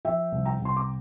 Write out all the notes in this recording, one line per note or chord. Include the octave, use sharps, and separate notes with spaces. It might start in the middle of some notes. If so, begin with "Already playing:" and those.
F3 E5 G5
C2
G5 A#5
C2
C6
D6